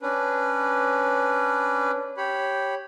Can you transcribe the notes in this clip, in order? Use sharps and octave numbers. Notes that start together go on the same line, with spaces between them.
C#4 D4 B4
G4 C#5 B5